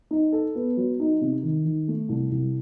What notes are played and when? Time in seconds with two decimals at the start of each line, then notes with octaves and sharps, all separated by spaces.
0.11 D#4
0.32 A4
0.55 B3
0.77 F#3
1.00 D#4
1.21 C3
1.43 D#3
1.65 D#3
1.88 A3
2.09 C2
2.31 C2